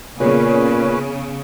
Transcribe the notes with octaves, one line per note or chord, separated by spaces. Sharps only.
A#2 C#3 B3 C#4 G#4 B4 C#5